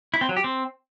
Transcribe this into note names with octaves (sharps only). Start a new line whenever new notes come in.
E4
C4
F#3
G4
C4